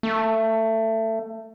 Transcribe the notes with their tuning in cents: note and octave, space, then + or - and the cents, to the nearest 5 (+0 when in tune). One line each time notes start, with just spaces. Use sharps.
A3 +20